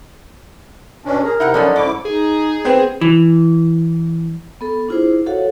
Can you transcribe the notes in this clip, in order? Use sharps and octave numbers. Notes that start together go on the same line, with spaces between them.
B2 C#4 D4
G#4 A#4
C3 D#4 E4 F#5 G5
D3 F3 F#3 B3 C#4 D#4 D#5
G#2 C#4 E4 D6
D#4 G#4
B3 C4
E3
B3 A4
D4 E4 F4 G#4 C5
F#4 A4 C#5 F5 F#5